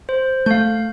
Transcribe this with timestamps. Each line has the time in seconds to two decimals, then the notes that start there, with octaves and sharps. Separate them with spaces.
0.09 C5
0.46 A3 F5 G6